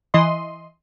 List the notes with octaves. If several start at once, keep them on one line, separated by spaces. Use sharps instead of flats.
E3 D#5 C6